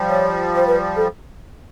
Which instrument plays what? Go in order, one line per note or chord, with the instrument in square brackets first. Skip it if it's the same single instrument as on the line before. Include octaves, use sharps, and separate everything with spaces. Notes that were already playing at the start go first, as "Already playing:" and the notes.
Already playing: [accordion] F3 G3
[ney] C#5
C5
B4
A4